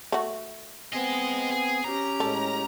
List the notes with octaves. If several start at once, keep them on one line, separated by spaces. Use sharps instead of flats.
A3 F#4
B3 C4 G#4 D#5 G#5
G#4
C#4 G4 A#5
A2 G#3 A4